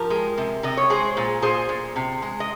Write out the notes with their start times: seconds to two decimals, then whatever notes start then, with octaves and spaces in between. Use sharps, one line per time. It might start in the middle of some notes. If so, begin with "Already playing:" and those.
Already playing: F3 G4 A#4
0.10 G#3
0.37 C3
0.63 C3 D#5
0.77 C#5
0.90 G#3 G#4 C5
1.17 A#2
1.42 A#2 G#4 C5
1.69 A#2
1.96 C3
2.22 G#3
2.40 D#5